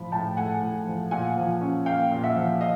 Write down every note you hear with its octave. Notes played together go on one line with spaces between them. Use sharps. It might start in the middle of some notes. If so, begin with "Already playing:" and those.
Already playing: A2 F3 B5
A2 G5 A5
A3 F#5 G#5
A2
F3
A#2 F#5 G#5
F3
C#4
A#3 F5 G5
A#2
E5 F#5
F3
D#5 F5